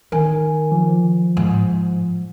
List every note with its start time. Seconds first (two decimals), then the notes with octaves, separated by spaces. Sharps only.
0.12 D#3 A#4 G#5
0.72 F3
1.37 G#2